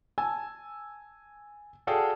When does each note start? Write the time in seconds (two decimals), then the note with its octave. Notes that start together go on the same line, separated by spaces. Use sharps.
0.18 G#5 A5 E6
1.87 F#4 G#4 A4 D5 F5 G5